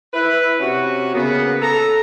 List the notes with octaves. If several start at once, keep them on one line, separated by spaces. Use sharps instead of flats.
E4 B4
C3 C#4 F#4
C#3 A#3 B3
A4 A#5